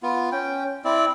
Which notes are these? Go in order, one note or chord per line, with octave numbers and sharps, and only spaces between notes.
B3 F4
C#4 G5
C4 E4 D5